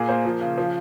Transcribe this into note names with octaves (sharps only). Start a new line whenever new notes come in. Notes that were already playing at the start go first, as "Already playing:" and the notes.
Already playing: A#2 G#4
A#3 C5
F3
C#3
F3